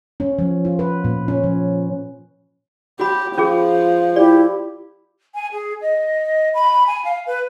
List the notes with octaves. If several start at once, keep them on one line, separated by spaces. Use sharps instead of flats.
C#4
F3
F4
B4
A#2
C#4
F3
F#4 G4 B5
F3 C#4 F4 G#4
E4 G4 D5
G#5
G#4
D#5
B5
G#5
F5
B4